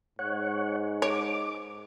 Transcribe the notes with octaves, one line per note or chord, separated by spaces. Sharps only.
G#2 C#5 F#5
C#5 D6